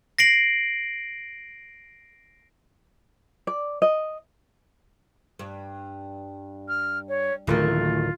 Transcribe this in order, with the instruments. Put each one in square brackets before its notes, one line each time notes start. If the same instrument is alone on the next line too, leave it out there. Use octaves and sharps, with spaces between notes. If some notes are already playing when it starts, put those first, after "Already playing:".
[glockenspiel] A#6 C7 D7 F#7
[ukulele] D5
D#5
[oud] G2
[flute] F6
C#5
[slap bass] D1 D#3 [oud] E3 A3 A#3 [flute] F4